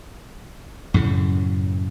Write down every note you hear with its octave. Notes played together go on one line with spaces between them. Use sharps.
F#2 A2 C#3